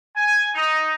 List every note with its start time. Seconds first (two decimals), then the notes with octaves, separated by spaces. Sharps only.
0.16 G#5
0.55 D#4